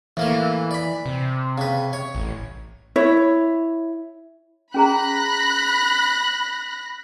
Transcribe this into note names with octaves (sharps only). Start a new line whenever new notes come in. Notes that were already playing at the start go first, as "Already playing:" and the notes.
A2 E3 A#3 A#4
D5 B5
C3
C#3 B4
C#5
A1
E4 C#5
C#4 G#4 A#5 B5 F#6 A#6